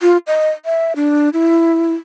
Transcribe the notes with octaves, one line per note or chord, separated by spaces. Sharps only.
F4
D#5
E5
D4
E4